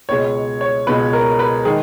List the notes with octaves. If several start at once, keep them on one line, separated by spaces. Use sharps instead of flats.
C#2 B2 G#3 C#5
C#5
C#2 B2 G#3 B4
A#4
B4
D#3 G#3 G#4